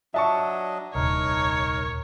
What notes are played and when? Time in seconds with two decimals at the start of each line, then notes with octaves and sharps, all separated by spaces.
0.14 F#3 D4 D#5 E5 A5 C#6
0.95 D#1 C2 D#4 A#4 C#5